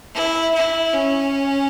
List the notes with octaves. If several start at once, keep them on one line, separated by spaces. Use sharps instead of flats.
E4
E4
C#4